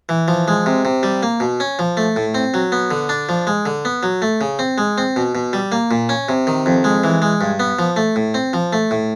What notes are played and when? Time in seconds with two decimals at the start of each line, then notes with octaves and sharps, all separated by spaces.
0.09 E3
0.28 F3
0.48 G#3
0.66 C3
0.85 C3
1.03 G3
1.23 A#3
1.40 B2
1.60 C#4
1.79 F3
1.97 A3
2.16 A2
2.35 C4
2.54 F#3
2.72 B3
2.91 D3
3.09 D4
3.29 F3
3.47 G#3
3.66 D3
3.85 B3
4.03 F#3
4.22 A3
4.41 C#3
4.59 C4
4.78 G#3
4.98 C4
5.16 B2
5.35 B2
5.53 G3
5.72 A#3
5.91 A#2
6.09 C#4
6.29 C3
6.47 D#3
6.66 F2
6.84 G#3
7.04 E3
7.22 G#3
7.41 G2
7.60 B3
7.79 F3
7.96 A3
8.16 A2
8.34 C4
8.53 F3
8.73 A3
8.91 A2